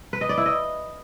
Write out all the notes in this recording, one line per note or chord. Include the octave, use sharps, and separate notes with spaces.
B4
D#5
D5
E4
D#5